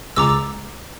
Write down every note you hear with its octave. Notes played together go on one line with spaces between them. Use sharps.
C#2 G#3 A#5 D6 E6 A6